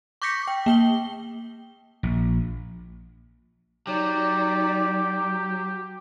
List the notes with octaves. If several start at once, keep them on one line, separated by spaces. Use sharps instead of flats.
C#6 D6 G6 A#6 B6 C#7
G5
A#3 G5 G7
A#1
F#3 D#4 G4 D5